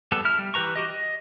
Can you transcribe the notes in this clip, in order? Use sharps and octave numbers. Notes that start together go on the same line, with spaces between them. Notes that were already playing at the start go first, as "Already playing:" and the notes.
G3 B3 A4
E4 F6
G3
E3 G4 B4 A#5 C#6
F#4 G4 D#5
D#5